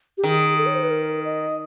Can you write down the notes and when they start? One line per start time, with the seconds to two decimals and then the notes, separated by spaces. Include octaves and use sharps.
0.18 G4
0.23 D#3 G#4
0.57 A4
0.66 C#5
0.75 C5
0.83 B4
0.91 A#4
1.25 D#5